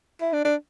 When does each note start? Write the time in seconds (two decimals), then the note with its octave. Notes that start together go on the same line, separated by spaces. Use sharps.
0.21 E4
0.33 D4
0.45 D4